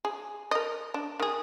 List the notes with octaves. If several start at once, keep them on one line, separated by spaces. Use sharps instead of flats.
G#4
A#4 D#5
D4
D#3 G#4